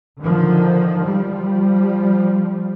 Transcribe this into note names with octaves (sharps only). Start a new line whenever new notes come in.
D3 D#3 F3
F3 G3